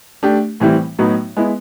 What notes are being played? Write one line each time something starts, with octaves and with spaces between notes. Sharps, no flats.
A3 D4 G4
A2 E3 G3 C4 E4
A2 F#3 B3 D#4 F#4
G#3 B3 E4